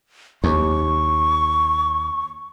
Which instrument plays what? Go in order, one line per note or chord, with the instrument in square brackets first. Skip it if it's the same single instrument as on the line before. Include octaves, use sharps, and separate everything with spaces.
[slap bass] D#2 [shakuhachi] C#6